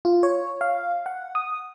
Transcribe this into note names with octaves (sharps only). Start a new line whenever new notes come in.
F4
C#5
F5
F#5
D#6